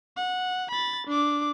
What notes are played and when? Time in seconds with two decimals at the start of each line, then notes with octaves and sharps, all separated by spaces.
0.17 F#5
0.71 B5 A6
1.07 D4 D6